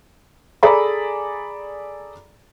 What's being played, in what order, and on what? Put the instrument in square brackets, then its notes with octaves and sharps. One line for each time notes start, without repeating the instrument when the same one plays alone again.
[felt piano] G#4 A4 D5 A#5 B5